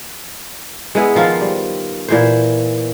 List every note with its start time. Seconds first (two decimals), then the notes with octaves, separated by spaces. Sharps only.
0.95 G#3 B3 E4
1.15 D#3 F3 F4 F5
1.41 G3
2.09 A#2 E3 C5